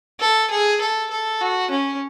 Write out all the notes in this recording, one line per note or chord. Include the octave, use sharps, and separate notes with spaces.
A4
G#4
A4
A4
F#4
C#4